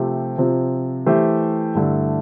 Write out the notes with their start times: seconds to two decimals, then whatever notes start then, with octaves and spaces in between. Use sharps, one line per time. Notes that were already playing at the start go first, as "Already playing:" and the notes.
Already playing: C3 F3 A3 C4 G4
0.38 C3 F3 C4
1.06 E3 A3 E4 G4 C5
1.75 G2 D3 A3 E4